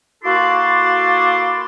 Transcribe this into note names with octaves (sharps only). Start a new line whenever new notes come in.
A#3 E4 F#4 A4 C6 D6